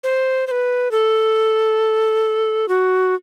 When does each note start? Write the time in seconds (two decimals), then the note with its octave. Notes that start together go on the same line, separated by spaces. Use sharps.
0.03 C5
0.47 C5
0.51 B4
0.91 A4
2.68 F#4